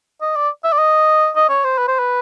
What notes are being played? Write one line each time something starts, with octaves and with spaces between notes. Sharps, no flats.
D#5
D5
E5
D5
D#5
D#5
C#5
C5
B4
C5
B4